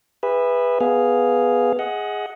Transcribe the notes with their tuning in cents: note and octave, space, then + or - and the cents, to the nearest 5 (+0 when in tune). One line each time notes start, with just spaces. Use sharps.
G#4 -35 B4 +0 E5 +0
B3 +0 G#4 +0 F5 +0
G#4 +0 D#5 +25 F#5 +0